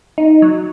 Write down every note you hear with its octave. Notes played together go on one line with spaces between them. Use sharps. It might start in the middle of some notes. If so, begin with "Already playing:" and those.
D#4
F#3